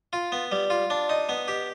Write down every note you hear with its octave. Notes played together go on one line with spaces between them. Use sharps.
F4
B3
G3
F4
D4
D#4
B3
G4